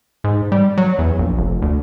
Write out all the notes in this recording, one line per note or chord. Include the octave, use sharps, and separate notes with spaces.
G#2
G3
F#3
E2
A#1
F1
D2